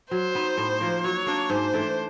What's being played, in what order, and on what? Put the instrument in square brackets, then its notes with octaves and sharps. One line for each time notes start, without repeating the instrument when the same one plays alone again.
[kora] F#3 [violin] C5
[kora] B3 D#4
A2
F3 A#3
[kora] F#3 [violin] C#5
[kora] A#3 D4
[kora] G#2 [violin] C5
[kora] E3 A3 D4